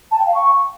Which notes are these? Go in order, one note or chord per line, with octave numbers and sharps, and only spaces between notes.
A5
G5
F5
C#6